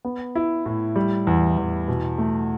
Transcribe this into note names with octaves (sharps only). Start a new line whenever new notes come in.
B3
E4
A2
G3
E2
E2
B2
A3